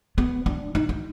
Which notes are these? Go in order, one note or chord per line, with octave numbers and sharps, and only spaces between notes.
B3
D4
D#4
D#4